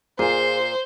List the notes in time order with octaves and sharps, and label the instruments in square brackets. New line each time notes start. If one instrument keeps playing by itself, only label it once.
[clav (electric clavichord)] A#2 [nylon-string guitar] F4 G#4 [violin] C5 [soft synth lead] C7